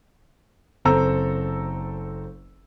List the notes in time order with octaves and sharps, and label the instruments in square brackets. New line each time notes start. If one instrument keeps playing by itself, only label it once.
[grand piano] F#1 C4 A4 A#5 E6